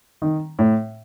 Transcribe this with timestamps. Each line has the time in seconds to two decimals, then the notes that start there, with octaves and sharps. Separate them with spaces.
0.22 D#3
0.59 A2